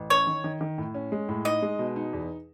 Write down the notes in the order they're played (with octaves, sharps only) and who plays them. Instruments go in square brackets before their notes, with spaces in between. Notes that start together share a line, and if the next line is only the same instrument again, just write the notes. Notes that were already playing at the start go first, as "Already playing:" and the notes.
Already playing: [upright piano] A1
[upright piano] C#4 [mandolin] C#5
[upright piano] D#3
D#3
D#3
A2
C#4
G#3
A2
[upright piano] D#4 [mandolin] D#5
[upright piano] G#3
B2
D#4
E2